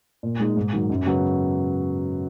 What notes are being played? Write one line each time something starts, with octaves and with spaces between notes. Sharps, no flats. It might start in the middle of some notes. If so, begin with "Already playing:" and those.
A#2
G#3 D#4
G#2
D#3 F#3
F#2
C#3 F#3 B3